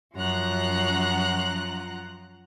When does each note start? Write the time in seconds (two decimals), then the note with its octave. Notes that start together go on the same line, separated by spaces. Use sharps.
0.15 F#2 F3 F4 F#5 A#5 F#6